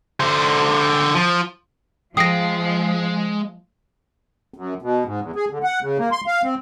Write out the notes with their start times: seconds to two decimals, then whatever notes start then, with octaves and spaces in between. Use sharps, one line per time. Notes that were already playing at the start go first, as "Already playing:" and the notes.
0.20 D3 C5
1.15 F3
2.17 F3 G#3 G5 D#6 A#6 C7 D7
4.54 F#2
4.82 B2
5.05 G#2
5.21 E2
5.35 G#4
5.50 D3
5.63 F#5
5.83 C#3
5.98 A#3
6.12 C6
6.27 F5
6.44 C4